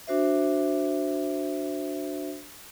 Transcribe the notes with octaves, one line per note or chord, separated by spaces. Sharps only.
D4 F#4 C5 E5